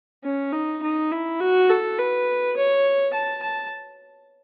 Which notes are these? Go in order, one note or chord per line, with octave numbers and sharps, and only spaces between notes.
C#4
D#4
D#4
E4
F#4
A4
B4
C#5
A5
A5